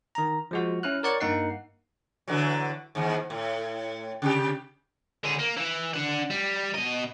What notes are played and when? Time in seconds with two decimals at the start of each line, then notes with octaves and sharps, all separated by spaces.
0.15 D#3 A#5
0.51 F3 G#3 F#4
0.83 C#4 E4 F6 F#6
1.03 A#4 C#5 D5 F#5 C#6 A6
1.20 G2 A#3 D#4 F#5 C7
2.28 D3 E3 F#3
2.95 D#2 G#2
3.30 A2
4.22 C3 G4
5.24 D3 G#4
5.39 A#3
5.57 E3
5.94 D4 F#5
6.30 G3
6.75 B2 D#5